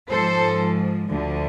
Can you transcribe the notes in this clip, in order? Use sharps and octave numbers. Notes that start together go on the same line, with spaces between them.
G#2 F3 A4 C5
D2 D3 F3